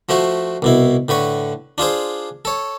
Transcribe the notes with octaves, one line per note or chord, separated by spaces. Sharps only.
F3 A3 F#4 C5
C2 B2 E4
A2 D3 B4 C#6
D4 F4 G#4 C5
A4 C#5